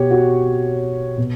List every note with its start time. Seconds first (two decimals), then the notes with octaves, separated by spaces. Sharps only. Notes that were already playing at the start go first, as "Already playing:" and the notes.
Already playing: B2 G4 C#5
0.11 F#4
1.18 B2